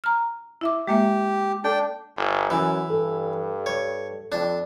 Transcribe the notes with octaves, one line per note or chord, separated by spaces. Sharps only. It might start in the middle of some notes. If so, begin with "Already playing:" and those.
A#5 F6
E4 E5 D6
G#3 A#3 G4 E5
D4 A4 G5
G1
F#2 E3
G2 A4
C#5
F2 D4